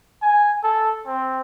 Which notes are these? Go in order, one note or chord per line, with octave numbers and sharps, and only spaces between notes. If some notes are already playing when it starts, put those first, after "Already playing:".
G#5
A4
C4